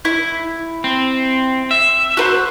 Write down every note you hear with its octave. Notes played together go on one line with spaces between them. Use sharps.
E4
C4
E5
F#4 B4 C5